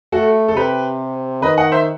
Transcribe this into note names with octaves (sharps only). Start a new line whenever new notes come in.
A3 F#4 A4
A4
C3 G4 B4
D#3 B4 D#5
D#5 F#5
C5 E5